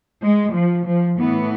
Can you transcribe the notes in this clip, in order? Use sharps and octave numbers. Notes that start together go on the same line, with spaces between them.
G#3
F3
F3
A2 E3 B3